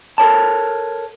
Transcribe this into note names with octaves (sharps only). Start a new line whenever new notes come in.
A4 A#4 C#5 A5